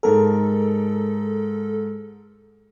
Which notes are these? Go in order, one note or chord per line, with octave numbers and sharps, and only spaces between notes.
G#2 A4 A#4